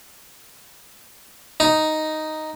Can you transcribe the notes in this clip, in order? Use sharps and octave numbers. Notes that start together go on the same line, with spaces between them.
D#4